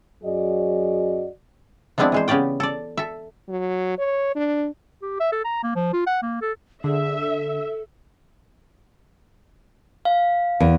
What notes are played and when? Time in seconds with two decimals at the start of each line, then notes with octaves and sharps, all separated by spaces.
0.24 F#2 F#3 F#4 G#4 D5 D#5
1.98 F3 G#3 B3 C4 D4 E4
2.12 E3 G#3 C5
2.28 C#3 B3 C#4 G4 D5 G5
2.60 A4 D5
2.97 A4 E5
3.49 F#3
3.99 C#5
4.35 D4
5.02 G4
5.20 E5
5.32 A4
5.45 A#5
5.63 A#3
5.76 F3
5.93 F4
6.07 F#5
6.22 A#3
6.42 A4
6.84 D3 G#4 E5
7.20 A4
10.05 F5
10.60 E2